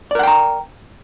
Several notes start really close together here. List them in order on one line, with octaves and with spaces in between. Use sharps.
D5 A#4 F#5 G5 A#5